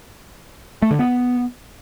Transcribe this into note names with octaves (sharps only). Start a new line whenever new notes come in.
A3
D3
B3